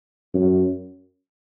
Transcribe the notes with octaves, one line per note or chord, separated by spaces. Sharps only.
F#2